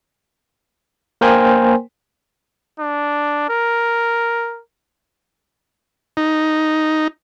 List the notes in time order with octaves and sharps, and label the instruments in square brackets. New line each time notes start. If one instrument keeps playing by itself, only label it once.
[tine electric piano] A#3 A#4 C5 G5 G#5 C6
[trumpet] D4
A#4
[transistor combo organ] D#4